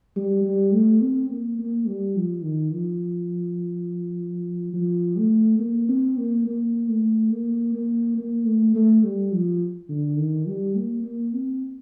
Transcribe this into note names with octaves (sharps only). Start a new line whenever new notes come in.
G3
G3
A3
C4
A#3
A#3
G3
F3
D#3
F3
F3
A3
A#3
C4
A#3
A#3
A3
A#3
A#3
A#3
A3
A3
G3
F3
D3
D#3
G3
A#3
A#3
C4